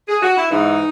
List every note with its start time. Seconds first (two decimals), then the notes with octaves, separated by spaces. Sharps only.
0.08 G#4
0.22 F#4
0.36 E4
0.49 G#2 E3 D#4